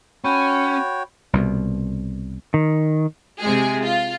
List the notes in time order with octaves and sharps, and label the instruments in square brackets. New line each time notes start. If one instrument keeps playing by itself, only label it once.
[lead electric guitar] C#4 [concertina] F#4 C#5 G5 [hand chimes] B5
[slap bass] C2 B2
[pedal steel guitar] D#3
[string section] C3 G#3 G#4
F4